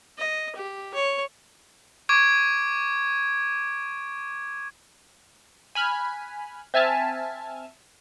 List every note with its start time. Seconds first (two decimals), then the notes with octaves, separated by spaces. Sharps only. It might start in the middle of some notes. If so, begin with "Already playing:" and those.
0.18 D#5
0.55 G4
0.94 C#5
2.09 C#6 D6 G#6 D7
5.75 G#5 B5 F6 F#6
6.74 C4 E5 G#5 A5 F6